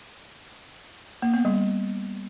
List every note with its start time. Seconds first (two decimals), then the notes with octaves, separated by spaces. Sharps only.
1.22 A#3
1.34 B3
1.45 G3